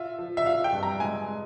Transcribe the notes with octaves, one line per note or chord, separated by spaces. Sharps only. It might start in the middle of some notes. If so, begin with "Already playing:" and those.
Already playing: F4 E5
F3
E5
F4 F5
G5
G2
A#5
G#3 G#5
G#3